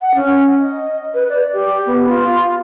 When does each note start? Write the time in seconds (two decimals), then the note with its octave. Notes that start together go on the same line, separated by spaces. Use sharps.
0.01 F#5
0.14 C#4
0.59 D#5
1.14 B4
1.29 D5
1.53 G4
1.86 B3
2.08 F4